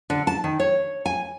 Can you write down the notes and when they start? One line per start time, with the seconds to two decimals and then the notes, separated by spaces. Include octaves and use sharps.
0.10 D3
0.27 A5
0.44 D#3
0.60 C#5
1.06 G#5